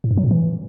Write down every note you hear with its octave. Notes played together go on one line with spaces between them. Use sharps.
A2
G2
F#3
A#2
E3